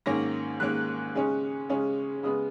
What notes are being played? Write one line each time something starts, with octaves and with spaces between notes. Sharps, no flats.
G#2 D#3 A#3 C#4 A#6
G#2 D#3 A#3 C#4 F#6
C#3 G#3 C#4
C#3 G#3 C#4
C#3 G#3 B3 D#6